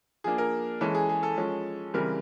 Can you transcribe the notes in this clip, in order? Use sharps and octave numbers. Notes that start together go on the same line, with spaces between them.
F3 A#3 D4 G#4
A#4
E3 G#3 C#4 A4
G#4
G#4
A4
F3 G#3 C#4
C#3 E3 G3 C4 A#4